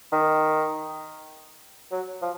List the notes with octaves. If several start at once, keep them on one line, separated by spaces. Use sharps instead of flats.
D#3
F#3
F3